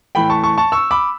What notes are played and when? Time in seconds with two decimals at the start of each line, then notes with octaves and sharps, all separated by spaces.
0.15 A2 E3 A3 G5 B5
0.30 A5 C#6
0.43 A5 C#6
0.57 A5 C#6
0.72 C#6 E6
0.91 B5 D6